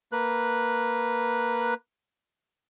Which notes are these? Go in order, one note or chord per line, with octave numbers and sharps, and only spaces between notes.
A#3 B4 F#6